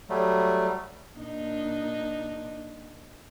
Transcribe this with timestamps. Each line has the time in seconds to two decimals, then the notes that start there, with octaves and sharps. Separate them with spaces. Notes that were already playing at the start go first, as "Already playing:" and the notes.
0.10 F#3 G3 A3
1.19 A#2 D4 D#4